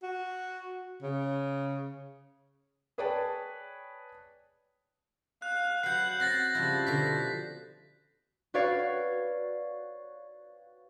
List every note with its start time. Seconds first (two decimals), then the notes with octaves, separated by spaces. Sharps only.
0.03 F#4
1.02 C#3
2.98 G#4 B4 C#5 D5 G5 A5
5.42 F5 F#6
5.83 F#3 B4 F#5 G6 C7
6.20 C4 A6 A#6 C7
6.55 C#3 F3 G3 E4
6.87 B2 D3 G5 B6
8.54 F#4 B4 C#5 D5 F5